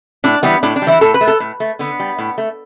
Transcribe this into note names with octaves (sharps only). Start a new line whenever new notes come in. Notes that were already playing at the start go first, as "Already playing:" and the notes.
A2 D4
E3 G3 B3
A2 D4
D4
G3
E3 E4
A2 A4
B4
A3
A4
A2
A3
D3 B3
G3
A2
A3